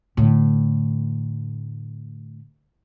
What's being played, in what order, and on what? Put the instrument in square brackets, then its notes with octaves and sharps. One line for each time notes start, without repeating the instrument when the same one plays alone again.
[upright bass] A2 D3